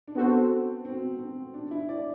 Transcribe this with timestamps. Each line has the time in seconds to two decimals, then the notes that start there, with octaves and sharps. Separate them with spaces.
0.08 D4
0.15 B3 C4 F#4 A4 C5
0.85 C4
1.19 C4
1.54 D4
1.71 E4
1.89 D5